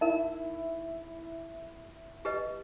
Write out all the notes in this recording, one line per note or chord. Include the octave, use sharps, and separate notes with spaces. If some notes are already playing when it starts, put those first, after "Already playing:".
D#4 E4 A#4
G4 B4 D#5